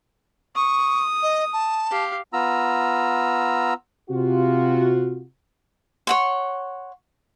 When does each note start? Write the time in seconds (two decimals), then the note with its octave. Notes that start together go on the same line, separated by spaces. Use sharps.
0.56 C#6 D#6
1.23 D#5
1.53 A5
1.91 G4 F5
2.33 B3 F4 A#5 E6
4.10 C3 F4 F#4
6.07 C#5 F#5 C6